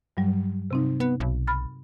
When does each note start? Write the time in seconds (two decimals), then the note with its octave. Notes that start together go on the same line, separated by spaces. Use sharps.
0.17 G2 F#3 G3
0.71 C3 C4 D#4
1.00 B3
1.20 B1
1.47 B5 F6 A6